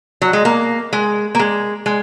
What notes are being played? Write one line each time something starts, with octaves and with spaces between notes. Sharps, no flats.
F#3
G#3
A#3
G#3
A#3
G#3
G#3